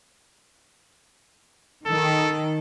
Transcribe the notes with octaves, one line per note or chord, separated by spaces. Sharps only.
D#3 A4